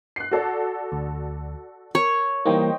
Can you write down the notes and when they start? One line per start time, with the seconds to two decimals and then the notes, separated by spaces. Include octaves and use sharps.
0.16 F#6 C7
0.31 F#4 A4 D5
0.92 D2
1.95 A#4 C#5
2.45 E3 G3 A#3 D#4 C5 G5